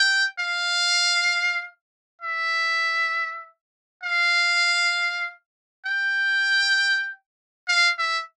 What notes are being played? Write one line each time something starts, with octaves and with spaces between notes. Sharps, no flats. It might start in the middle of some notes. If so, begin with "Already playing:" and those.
Already playing: G5
F5
E5
F5
G5
F5
E5